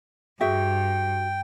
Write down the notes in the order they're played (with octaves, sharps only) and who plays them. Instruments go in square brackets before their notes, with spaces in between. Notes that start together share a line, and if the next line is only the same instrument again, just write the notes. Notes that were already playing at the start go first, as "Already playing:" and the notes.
[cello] G2 [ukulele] F#4 G#4 E5 [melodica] G5